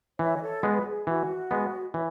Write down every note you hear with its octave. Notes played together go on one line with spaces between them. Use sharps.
E3 C#5 E5
D#5
A4 C#5
G#3 B3 B4
G#4
E3 F#4
G#3 B3
E3 C#5 E5